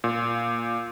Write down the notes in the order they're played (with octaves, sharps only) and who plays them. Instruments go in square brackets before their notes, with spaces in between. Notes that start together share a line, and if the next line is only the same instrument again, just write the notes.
[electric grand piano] A#2